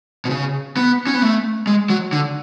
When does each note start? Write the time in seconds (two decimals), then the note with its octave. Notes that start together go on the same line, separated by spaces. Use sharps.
0.25 B2
0.30 C#3
0.77 B3
1.07 C#4
1.14 B3
1.22 A3
1.67 G#3
1.90 F#3
2.12 D3